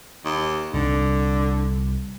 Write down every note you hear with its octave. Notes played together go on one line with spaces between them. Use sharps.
D#2
C2 D3